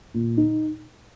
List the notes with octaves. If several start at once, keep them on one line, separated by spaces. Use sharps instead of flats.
A#2
D#4